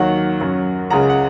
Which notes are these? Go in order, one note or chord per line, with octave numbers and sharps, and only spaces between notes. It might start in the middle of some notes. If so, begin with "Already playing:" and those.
Already playing: D#2 D#3 F#3 F#5
F#2 F#3
C#2 C#3 G#3 F#5 A#5
F#5